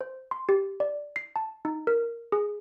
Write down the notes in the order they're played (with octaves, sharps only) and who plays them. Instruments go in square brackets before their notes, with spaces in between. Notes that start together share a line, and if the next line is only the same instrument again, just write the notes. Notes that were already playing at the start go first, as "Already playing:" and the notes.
[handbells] C5
C6
G4
D5
C7
A5
D#4
A#4
G#4